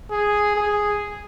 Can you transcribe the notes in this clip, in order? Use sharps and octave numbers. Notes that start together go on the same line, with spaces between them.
G#4
G#4